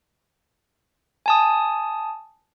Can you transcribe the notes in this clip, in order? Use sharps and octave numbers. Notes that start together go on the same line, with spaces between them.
G#5 A5 D#6